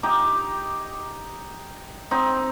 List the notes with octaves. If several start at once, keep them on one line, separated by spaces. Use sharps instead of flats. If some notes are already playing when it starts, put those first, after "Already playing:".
D#4 G4
C4 D#4